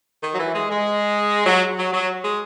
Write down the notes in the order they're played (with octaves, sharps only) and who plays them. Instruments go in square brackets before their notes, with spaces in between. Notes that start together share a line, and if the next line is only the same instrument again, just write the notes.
[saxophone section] D#3
F#3
E3
G#3
G#3
F#3
F#3
F#3
G#3